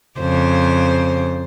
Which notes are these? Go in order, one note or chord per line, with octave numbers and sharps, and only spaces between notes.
F2 C#3 C5